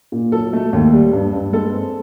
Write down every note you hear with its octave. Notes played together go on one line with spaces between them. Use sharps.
A#2
F#3 A4
A3
D#2
G3
G2
G2
G#3 A4
C4